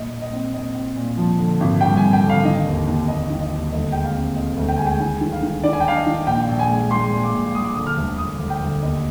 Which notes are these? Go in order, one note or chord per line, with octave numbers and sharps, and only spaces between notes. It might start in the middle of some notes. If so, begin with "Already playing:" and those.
Already playing: A#2 D#5
A#2
D#5
C4
C4 D#5
C4
A#2
F3
D3
G#1
G2 G5
G#5
G#1
G5
D3
F5
D#3 D#5
D#2
D#2
D#2 D#5
D#3
D#5
D#2
D2 D#5
G#3 G5
F5
C4
C4 D#5
D2
G5
G#3 G#5
G5
D#3 G#5
D#3
F5
D#3
D#3 D5
G#5
G5
D4 F5
D#5
D#3
A#1 G5
A#1
G#5
G#3
G#3 C6
A#1
D6
A#1
G#3 D#6
D6
D3 D#6
F6
D2
D2 D#6
D2
G5
D2
D#2 D#5